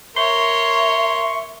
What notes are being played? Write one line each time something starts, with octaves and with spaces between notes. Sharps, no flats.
A#4 C#5 E5 C6 C#6